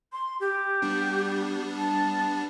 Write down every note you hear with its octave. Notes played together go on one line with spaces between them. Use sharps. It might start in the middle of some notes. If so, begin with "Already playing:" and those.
C6
G4
G3 B3 D4
A5